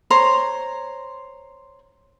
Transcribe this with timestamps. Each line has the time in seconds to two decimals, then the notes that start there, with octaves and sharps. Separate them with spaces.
0.11 C5 C#5 A#5